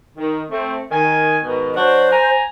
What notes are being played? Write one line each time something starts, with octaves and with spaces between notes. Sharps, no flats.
D#3
A3 C4
D#3 G#5
G#2 B2 D#3
F#3 D4 F#4 C5
G#5 A#5